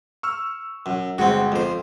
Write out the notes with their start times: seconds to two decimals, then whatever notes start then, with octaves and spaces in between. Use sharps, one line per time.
0.23 C#6 E6 F6
0.86 F#2
1.18 G1 G#3 C4 F#4 F#5
1.52 F2 C5